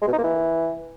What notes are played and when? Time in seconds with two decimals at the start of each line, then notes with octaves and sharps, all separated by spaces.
0.02 G#3
0.07 B2
0.13 D#4
0.18 A#3
0.23 E3